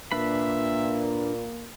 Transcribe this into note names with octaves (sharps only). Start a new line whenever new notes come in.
A#2 A#3 D4 B4 E5 B5